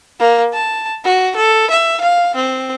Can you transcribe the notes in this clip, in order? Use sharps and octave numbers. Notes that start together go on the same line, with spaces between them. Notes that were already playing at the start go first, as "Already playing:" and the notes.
A#3
A5
F#4
A4
E5
F5
C4